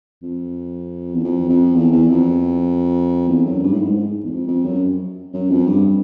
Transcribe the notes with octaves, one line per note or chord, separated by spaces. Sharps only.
F2
E2
F2
F2
E2
E2
F2
E2
F#2
G2
A2
G#2
E2
F2
F2
F#2
F#2
F2
G2